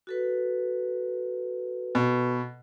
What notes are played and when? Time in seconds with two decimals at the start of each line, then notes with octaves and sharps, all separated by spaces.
0.07 F#4 A4 B4
1.95 B2